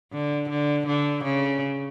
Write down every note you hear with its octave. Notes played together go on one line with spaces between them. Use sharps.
D3
D3
D3
C#3